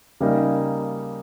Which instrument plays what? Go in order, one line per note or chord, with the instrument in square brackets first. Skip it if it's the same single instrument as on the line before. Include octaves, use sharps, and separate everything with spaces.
[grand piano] C#3 G3 A#3 D#4